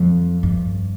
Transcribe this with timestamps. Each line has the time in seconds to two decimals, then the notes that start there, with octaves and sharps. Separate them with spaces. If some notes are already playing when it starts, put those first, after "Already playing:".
Already playing: F2
0.43 G2